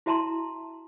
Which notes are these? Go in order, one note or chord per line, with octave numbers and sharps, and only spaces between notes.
E4 F#4 E5 A5 A#5 C6